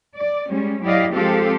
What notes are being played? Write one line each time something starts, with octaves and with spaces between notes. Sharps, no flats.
D5
G3 G#3 C#4
F#3 E4 G4 D5 D#5 F5
F3 G#3 C4 F4 G4 A4